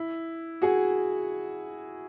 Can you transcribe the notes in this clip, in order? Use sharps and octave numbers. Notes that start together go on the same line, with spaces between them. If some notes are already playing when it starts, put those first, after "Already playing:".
Already playing: E4
F#4 G#4